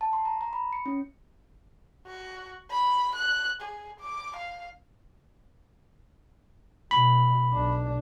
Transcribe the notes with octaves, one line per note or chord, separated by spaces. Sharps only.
A5
C6
A#5
A#5
B5
C#7
C#4
F#4
B5
F#6
G#4
D6
F5
B2 B5
B1 D4